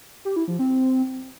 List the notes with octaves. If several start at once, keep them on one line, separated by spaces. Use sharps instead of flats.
G4
E4
F3
C4